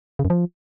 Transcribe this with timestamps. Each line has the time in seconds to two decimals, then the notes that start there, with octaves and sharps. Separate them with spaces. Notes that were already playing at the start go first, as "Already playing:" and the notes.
0.19 C#3
0.25 F#2
0.30 F3